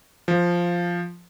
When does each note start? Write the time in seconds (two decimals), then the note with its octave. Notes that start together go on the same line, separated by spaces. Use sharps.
0.28 F3